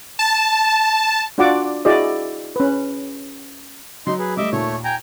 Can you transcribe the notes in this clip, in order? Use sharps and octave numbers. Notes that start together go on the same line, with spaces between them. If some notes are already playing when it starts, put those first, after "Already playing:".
A5
D4 F4 F#4 D5 F#5 D6
E4 F#4 G#4 D5 D#5
C#4 B4
F#3 D#4 C6
G#4 B4
G3 A3 D#5 E5 D6
D#2 A#2 A3 C#5
G5 G#5 A#5